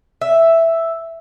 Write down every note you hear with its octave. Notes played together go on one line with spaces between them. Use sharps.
E5